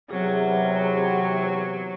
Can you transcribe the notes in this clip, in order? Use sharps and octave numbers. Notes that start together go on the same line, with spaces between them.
E2 C3 F#3 G#4 F#5